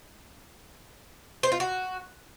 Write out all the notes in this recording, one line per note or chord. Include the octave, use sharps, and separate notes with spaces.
C5
F4
F#4